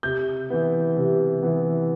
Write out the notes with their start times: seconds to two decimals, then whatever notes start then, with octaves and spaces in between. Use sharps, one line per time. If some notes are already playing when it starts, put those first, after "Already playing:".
0.03 C3 G6
0.50 E3 B3
0.97 C3
1.43 E3 B3